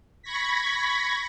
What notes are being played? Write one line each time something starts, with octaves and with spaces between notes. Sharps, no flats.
B5 C#6 G#6 A#6 B6